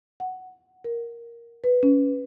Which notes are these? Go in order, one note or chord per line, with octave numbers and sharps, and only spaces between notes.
F#5
A#4
B4
C#4